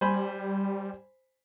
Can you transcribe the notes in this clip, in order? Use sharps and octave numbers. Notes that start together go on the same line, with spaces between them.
G3 C5 G#5 B5